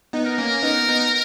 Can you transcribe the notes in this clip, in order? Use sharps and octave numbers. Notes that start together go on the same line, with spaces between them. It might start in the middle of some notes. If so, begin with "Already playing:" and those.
B3 D#4
A#4
A#3 C#4
B3 D#4
B3 D#4